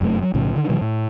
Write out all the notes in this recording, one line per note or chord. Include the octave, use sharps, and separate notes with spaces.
F1 F#2 A#2 A3
F#3
B1 A2 C#3 F3
D3 D#3
B2 D#3 F3 G3
A2